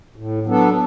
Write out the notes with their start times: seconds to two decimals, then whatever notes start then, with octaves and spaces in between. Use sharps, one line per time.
0.16 A2
0.46 F#3 B3 D4 A4